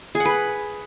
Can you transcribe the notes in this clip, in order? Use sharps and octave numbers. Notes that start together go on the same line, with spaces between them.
G#4
F#5
B4